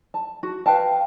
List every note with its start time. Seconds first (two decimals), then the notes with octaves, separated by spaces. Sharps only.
0.14 A5
0.43 F#4
0.66 B4 F5 G5 A5